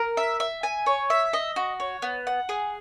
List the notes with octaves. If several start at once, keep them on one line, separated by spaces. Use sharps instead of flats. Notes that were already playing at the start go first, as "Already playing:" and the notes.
Already playing: A#4
E5
E5
G#5
C#5
E5
D#5
F#4
C#5
B3
F#5
G#4